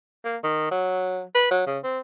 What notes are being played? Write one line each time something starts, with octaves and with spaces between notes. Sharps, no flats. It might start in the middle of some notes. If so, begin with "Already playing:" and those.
A#3
D#3
F#3
B4
F#3
C#3
C4